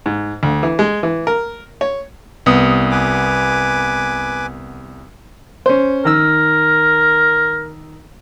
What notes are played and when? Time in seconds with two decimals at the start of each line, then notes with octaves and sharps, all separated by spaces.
0.06 G#2
0.43 D2
0.63 E3
0.79 G#3
1.03 E3
1.27 A#4
1.81 C#5
2.46 C2 B3 D#6
2.91 B4 G#5 D6
5.66 C#4 C5
6.05 D#3 A#4 E6